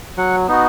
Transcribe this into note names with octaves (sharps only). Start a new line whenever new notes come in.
F#3 F#5
B3 D#4 F#4